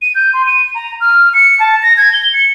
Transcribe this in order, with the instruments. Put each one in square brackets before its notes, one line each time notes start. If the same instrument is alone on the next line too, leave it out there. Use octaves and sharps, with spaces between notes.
[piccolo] D#7
G6
C6
D#7
A#5
F6
C#7
A5
A#6
G#6
G7
C#7